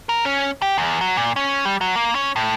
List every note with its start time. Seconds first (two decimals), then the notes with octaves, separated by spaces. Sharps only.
0.09 A#4
0.25 C#4
0.62 G4
0.78 E2
1.01 F#3
1.17 A#2
1.36 C#4
1.65 G3
1.81 F#3
1.95 A#3
2.15 C#4
2.36 A2